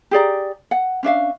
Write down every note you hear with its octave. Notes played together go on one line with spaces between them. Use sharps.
G4 G#4 D5 A#5
F#5
C#4 D4 E5 F5